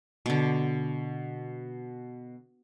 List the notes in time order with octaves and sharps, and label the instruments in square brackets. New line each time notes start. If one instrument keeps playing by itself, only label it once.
[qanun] B2 D3